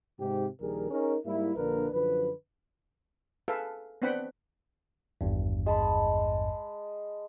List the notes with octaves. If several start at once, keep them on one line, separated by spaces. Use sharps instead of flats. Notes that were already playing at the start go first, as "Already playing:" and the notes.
G#2 C3 G4
A#1 D#3 G3 G#4 A#4
C#4 D#4 G#4 A#4
G#2 G3 A#3 E4
A#1 D3 A#3 D4 A#4 B4
F#2 D3 F3 B4
G#4 A4 B4 E5 F5
B3 C4 D4 F#5 G5 B5
G#1 E2 G2
G#3 A5 B5